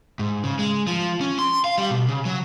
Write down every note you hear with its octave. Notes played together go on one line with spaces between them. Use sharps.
G#2
C#3
G#3
F3
C#4
C6
F5
G3
B2
C#3
F#3